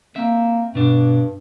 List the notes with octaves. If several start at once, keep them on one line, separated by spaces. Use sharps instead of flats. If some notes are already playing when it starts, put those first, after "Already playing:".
A#3 C4 E5
G2 B2 D4